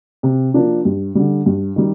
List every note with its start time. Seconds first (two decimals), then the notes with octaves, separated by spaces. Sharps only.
0.23 C3
0.54 F3 A#3 D4 F4
0.85 G2
1.15 D3 G3
1.46 G2
1.76 D#3 G3